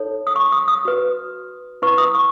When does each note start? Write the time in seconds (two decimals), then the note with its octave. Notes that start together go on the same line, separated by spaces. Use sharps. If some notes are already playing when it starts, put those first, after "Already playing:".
Already playing: D#4 A4 C#5
0.27 D#6
0.36 C#6
0.52 D#6
0.68 D#6
0.85 F#4 B4
1.82 E4 B4 C#6
1.98 D#6
2.15 C#6